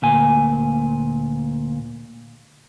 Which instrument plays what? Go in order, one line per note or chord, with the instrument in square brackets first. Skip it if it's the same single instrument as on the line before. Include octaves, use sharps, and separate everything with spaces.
[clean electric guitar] D2 A#2 G#5